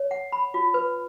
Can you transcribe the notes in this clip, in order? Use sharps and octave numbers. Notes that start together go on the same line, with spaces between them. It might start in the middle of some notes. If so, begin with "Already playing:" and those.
Already playing: C#5
F#5
B5
F4
B4